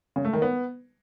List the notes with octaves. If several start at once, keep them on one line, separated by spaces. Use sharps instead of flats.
C#3
A3
D#3
B3